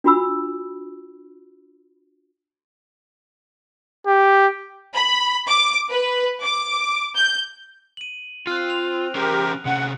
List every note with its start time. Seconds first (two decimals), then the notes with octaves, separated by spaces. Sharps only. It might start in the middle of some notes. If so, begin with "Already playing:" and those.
0.04 D4 F4 F#4 B5 E6
4.07 G4
4.94 B5
5.48 D6
5.90 B4
6.42 D6
7.17 G6
7.97 D#7 F#7
8.47 C4 F4 F6 F#6
8.70 F7
9.15 C#4 G4 G#4 A#4 C5
9.65 C3 C#4 F#5